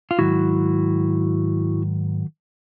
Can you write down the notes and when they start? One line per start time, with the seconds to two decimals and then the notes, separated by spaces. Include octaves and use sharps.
0.11 F4
0.19 G#2 D#3 F#3 E4 F#4